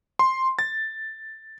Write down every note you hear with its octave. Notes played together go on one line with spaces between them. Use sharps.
C6
A6